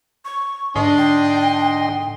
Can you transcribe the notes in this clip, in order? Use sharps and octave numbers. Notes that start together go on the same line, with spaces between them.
C#6
G#2 D3 D4 D#5 C6
G5